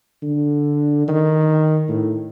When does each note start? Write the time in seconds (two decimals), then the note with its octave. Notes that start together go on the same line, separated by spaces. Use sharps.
0.22 D3
1.08 D#3
1.88 A2